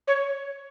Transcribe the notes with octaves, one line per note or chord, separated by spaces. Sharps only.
C#5